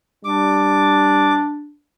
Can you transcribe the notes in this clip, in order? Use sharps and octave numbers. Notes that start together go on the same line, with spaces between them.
G3 D4 D6